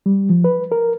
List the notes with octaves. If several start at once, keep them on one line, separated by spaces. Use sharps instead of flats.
G3
F3
B4
A#4